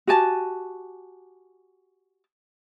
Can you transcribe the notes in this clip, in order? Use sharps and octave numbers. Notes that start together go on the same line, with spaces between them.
F#4 G4 G#5 A5